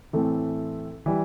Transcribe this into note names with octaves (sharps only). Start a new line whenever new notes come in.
A2 E3 A3 C4
E3 G3